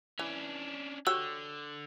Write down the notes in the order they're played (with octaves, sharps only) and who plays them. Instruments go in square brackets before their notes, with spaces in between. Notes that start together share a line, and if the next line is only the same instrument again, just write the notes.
[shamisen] E3 [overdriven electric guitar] C#4 D4
[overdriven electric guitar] D3 [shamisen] F#4 G4 C#5 [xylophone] E6